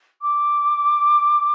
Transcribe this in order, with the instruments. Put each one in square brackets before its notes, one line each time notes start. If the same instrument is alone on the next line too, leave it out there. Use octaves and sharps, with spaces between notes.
[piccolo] D6